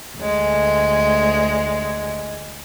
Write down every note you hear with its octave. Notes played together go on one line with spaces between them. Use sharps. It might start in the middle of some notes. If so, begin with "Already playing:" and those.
D2 G#3